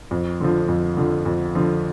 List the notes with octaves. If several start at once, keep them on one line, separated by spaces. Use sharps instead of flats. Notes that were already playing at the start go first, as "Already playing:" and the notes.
F2
D3 F3
F2
D3 F3
F2
D3 F3